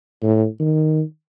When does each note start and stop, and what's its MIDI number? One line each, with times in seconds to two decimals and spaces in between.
0.23 0.46 45
0.60 1.02 51